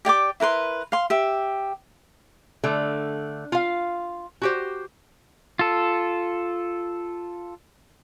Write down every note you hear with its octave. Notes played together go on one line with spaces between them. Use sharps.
G4 D5 G5 D6
E4 A#4 B4 C6
F5 C6
G4 E5
D3 A3
F4 F5
F#4 G4 C5
F4 A4